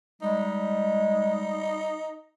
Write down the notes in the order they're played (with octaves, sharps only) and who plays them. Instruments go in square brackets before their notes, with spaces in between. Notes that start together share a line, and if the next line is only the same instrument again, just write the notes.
[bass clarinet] G3 [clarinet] G#3 [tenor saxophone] D#4